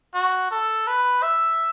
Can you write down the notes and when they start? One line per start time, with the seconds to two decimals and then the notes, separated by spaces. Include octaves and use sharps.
0.14 F#4
0.51 A4
0.87 B4
1.23 E5